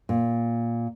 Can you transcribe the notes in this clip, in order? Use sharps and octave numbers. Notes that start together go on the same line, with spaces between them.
A#2